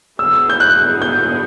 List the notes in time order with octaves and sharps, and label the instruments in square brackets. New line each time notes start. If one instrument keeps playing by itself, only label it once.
[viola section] D3 F#3 B3 E4 G#4 [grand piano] E6
[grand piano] G6
F#6
G6